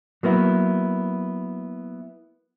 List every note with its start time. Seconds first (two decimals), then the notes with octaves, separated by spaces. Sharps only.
0.23 F#3 A#3 B3 E4